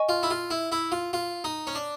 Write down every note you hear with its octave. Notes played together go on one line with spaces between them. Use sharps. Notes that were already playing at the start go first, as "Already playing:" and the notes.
Already playing: D#5 G#5 C#6
F4
E4
F4
E4
E4
F4
F4
D#4
C#4
D4